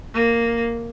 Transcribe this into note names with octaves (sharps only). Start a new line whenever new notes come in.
A#3